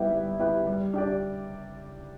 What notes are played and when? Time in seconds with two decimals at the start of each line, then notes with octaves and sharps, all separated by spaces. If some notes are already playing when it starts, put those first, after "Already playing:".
Already playing: G3 B3 E4 G4 B4
0.11 G3
0.39 B3 E4 G4 B4
0.67 G3
0.94 D4 G4 D5